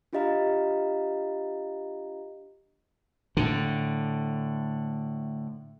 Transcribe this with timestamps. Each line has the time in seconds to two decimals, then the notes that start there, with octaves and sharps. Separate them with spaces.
0.13 D4 F4 G4 D#5 F5 A#5
3.37 A2 D3